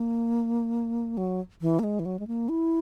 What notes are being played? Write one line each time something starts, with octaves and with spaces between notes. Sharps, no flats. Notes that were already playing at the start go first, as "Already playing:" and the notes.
Already playing: A#3
F#3
E3
A#3
G#3
E3
F#3
G#3
A#3
E4